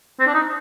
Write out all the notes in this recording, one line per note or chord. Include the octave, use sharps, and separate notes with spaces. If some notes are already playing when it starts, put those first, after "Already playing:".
C4
D4
D#4